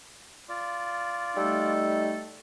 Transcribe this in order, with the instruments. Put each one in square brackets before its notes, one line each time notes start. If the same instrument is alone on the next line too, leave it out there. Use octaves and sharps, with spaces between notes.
[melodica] F4 D5
[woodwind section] G3 A3 A4 [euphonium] D#4